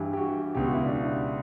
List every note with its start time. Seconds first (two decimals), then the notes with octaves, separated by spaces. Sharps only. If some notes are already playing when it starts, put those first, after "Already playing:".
Already playing: G2 E3 G4
0.13 G4
0.17 F#4
0.55 C#2 B2 G4
0.65 F#4
0.74 E4
0.84 D4